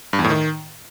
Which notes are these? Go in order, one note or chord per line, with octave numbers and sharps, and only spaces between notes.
G2
E2
A2
D#3